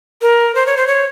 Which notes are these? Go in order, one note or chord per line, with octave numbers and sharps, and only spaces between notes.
A#4
C5
C#5
C5
C#5